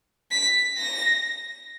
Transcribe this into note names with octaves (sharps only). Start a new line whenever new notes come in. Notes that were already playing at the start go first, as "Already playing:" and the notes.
B6
A#6